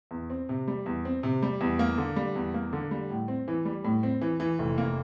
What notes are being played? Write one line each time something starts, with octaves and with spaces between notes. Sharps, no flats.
E2
C4
C3
G3
E2
C4
C3
G3
E2
A#3
D3
G3
E2
A#3
D3
G3
A2
C4
E3
G3
A2
C4
E3
E3
F1
A#3